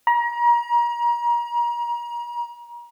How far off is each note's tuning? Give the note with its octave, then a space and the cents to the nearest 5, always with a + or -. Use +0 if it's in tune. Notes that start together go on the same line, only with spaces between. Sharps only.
A#5 +35